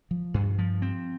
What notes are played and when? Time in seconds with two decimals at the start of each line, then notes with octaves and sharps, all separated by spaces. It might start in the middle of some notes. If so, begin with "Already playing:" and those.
0.11 F3
0.34 G2
0.58 F3
0.82 C4